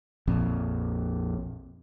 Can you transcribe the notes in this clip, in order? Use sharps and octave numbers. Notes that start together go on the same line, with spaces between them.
A#1 F2